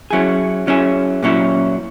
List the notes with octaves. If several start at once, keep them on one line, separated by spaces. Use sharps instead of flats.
F#3 C#4 E4 G#4
F#3 C#4 E4 G#4
A#2 F#3 C#4 E4